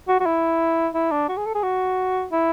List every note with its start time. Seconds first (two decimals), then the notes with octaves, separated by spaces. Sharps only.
0.08 F#4
0.20 F#4
0.26 E4
0.94 E4
1.11 D4
1.29 F#4
1.37 G#4
1.46 A4
1.55 G#4
1.63 F#4
2.32 E4